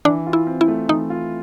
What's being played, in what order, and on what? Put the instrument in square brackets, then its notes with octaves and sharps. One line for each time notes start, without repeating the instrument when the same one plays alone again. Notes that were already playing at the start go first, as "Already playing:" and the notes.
[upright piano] E3 [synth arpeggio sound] D4
[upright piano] F4
[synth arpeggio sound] E4
[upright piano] C4
[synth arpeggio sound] E4
[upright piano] A3
[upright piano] E3 [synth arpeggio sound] D#4
[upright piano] F4